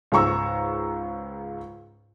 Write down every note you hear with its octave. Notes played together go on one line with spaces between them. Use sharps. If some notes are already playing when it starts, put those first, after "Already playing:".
C#2 G#2 A#5 C#6 E6